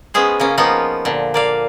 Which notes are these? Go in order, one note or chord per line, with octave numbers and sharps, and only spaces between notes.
G#3 B3 C#4 G#4 C5
C#3 A#3 C#4
F3 A#3 B3 C#4 D#4 F4
A#2 D3
A#3 D5 F5